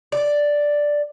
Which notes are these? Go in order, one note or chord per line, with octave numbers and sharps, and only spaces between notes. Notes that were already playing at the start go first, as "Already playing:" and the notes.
D5